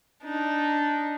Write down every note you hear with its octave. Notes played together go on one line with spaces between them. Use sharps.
D4 D#4